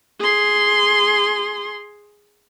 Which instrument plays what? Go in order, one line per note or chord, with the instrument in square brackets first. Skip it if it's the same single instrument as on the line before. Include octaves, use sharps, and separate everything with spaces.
[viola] G#4 C6